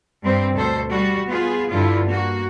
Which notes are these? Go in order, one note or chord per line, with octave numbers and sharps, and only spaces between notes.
G2 G3 C4
D2 B2 A4 C5
G3 F#4
B3 F4 G#4
G2 D3 E4 F4
A#3 F#4